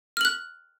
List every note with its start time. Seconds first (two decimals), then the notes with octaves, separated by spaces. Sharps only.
0.17 F6
0.21 F#7
0.25 F#6